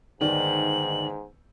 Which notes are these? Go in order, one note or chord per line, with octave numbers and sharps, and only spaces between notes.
G1 G#2 D#3 D5 F#7